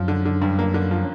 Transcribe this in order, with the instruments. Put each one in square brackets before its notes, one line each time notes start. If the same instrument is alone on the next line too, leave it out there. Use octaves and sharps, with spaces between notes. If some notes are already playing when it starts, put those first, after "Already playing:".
Already playing: [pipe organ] F#2 F#3 [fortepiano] F3
[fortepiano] D3
D3
G2
A#3
D3
F3